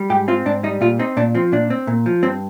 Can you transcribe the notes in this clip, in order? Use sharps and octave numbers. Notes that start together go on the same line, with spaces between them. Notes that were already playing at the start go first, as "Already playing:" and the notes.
Already playing: G3
G#2 G4
C4 F4
G#2 D4
G3 D#4
A#2 F4
C4 D#4
A#2 D4
F3 C4
A#2 D4
C4
A#2
F3
G2 C4